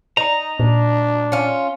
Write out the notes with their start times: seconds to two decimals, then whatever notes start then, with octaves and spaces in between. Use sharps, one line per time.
0.17 D#4 A#5
0.60 A#2 D4
1.32 C#4 F4